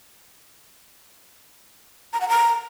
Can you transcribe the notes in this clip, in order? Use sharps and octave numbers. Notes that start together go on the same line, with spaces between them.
A#5
F#5
A#5